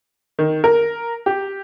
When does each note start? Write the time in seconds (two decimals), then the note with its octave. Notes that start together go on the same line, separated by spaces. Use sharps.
0.39 D#3
0.64 A#4
1.26 G4